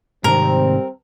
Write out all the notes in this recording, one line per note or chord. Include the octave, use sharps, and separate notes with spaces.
G#2 C3 D#3 G3 C4 A#4